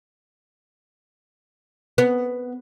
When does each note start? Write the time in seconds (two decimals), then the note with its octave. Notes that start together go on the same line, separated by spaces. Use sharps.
1.98 B3